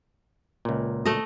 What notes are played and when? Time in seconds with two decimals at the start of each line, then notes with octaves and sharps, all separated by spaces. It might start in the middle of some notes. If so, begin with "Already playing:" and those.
0.65 C#2 A#2
1.05 A3 D#5